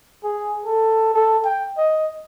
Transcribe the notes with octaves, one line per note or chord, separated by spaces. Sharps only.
G#4
A4
A4
G5
D#5